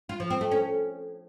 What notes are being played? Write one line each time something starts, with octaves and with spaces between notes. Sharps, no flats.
F4
F3
C4
A3
C#4